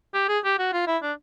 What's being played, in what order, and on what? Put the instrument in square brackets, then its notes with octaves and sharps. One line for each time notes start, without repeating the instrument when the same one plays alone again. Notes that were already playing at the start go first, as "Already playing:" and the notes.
[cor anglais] G4
G#4
G4
F#4
F4
E4
D4